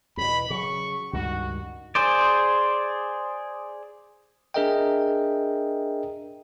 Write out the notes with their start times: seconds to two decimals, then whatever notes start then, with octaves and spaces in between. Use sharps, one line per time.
0.17 E2 B2 B5
0.50 C#3 F#3 C#6
1.13 C#2 G2 D#3 F#4
1.95 G#4 C5 D5
4.54 D4 G#4 A#4 D#5 E5 G5